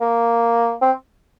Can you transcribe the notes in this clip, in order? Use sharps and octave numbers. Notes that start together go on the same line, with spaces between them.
A#3
C4